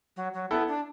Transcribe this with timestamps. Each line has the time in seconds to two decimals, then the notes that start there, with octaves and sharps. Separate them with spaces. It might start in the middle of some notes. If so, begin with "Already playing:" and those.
0.16 F#3
0.34 F#3
0.51 B3 E4 A4
0.68 D4